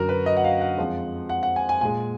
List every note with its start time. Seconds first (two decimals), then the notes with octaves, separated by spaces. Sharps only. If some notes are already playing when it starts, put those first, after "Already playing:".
Already playing: F#2 D3 F#3 F#4 A#4
0.09 B4
0.26 D#5
0.37 F#5
0.44 F5
0.61 F#5
0.78 F2 F3 G#3
1.29 F#5
1.43 F#5
1.56 G#5
1.69 G#5
1.81 A#2 G#3 G#5